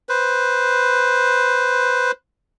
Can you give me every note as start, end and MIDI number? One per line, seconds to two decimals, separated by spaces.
0.09 2.12 71
0.09 2.12 72